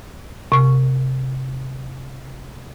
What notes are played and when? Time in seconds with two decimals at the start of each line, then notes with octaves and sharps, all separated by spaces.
0.52 C3 C#6